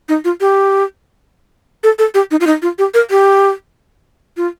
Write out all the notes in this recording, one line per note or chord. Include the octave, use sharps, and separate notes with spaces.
D#4
F4
G4
A4
A4
G4
D#4
F4
D#4
F4
G4
A#4
G4
F4